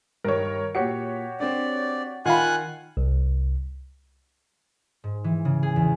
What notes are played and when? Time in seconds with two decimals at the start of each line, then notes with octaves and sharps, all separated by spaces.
0.24 G2 D#3 A#4 C#5
0.75 A#2 F#4 G4 C#5 C#7
1.40 C4 D4 D5
2.26 D#3 F4 F5 F#5 G#5 B5 F#6
2.97 C2
5.04 G#2
5.24 E3
5.45 C#3
5.63 G#4
5.76 E2